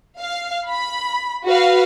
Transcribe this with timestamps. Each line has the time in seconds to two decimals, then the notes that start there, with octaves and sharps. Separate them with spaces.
0.19 F5
0.68 B5
1.45 F#4 B4 F5